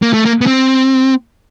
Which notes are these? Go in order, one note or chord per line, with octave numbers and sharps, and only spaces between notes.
A#3
A3
A#3
B3
C4